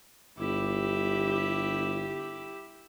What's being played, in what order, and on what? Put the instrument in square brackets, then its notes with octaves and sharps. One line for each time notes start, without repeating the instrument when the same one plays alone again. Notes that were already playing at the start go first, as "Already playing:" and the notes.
[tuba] G1 [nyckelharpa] E4 G4